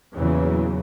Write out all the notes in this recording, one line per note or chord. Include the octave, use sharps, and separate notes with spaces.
E2 A#2 C#3 E3 F#3